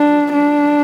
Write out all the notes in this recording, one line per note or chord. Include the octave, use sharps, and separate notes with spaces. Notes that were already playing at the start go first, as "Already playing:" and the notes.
Already playing: D4
D4